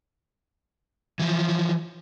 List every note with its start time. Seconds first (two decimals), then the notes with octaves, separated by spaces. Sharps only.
1.19 E3 F3